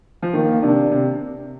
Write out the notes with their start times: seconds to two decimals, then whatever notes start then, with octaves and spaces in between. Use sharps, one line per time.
0.22 F3
0.33 D#3 A#3
0.63 C3 D4
0.91 C3